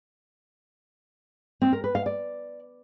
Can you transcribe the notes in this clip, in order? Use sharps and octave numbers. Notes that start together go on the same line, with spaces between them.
C4
A#4
B4
F5
D5